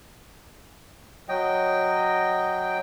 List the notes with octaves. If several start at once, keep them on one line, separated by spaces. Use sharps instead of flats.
F#3 D#5 G5